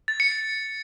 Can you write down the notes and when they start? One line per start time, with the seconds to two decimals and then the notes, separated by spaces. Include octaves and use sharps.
0.08 A6
0.20 C#7
0.32 C#7